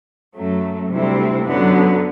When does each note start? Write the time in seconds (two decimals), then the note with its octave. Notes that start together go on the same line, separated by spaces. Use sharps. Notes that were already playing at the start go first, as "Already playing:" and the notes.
0.34 F#2 F#3 A3
0.90 D2 C3 G3 C4 E4
1.46 F#2 D3 F#3 B3